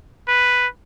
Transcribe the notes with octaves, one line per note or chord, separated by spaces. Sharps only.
B4